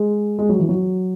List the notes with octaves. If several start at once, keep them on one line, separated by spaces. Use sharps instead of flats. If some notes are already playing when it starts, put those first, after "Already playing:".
Already playing: G#3
G#3
F#3
E3
F#3